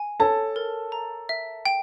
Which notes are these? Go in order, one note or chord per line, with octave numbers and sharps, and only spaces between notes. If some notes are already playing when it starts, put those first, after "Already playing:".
Already playing: G#5
A4 C#5 A5
A#4
A#5
E5
G5